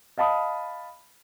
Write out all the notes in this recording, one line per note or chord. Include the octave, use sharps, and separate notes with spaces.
D#5 F5 A5 B5 D#6